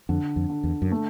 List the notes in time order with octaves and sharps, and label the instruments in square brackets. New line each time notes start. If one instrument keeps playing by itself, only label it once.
[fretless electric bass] F2 [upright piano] D3
[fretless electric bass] F2
[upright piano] D3
[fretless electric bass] E2
F#2
[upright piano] A3